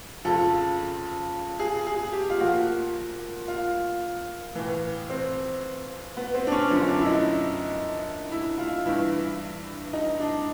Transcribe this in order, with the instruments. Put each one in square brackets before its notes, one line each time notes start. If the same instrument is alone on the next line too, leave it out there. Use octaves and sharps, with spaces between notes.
[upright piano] F2 C#3 F3 A4
G#4
G#4
G4
F4
A#2 F3 F#4
F4
A2 E3
C4
B3
C4
D4
C#4
F#2 D3 F3 C#4
D4
E4
D#4
E4
F4
G2 E3 E4
D#4
D4